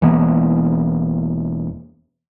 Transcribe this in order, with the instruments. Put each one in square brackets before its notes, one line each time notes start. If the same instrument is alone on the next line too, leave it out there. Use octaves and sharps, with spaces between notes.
[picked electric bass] E1 E3 A#3 B3